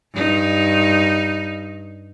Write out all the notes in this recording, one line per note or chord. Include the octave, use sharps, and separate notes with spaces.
G2 D#4